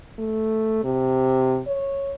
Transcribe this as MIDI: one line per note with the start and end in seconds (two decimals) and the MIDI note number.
0.19 0.80 57
0.84 1.61 48
1.67 2.15 73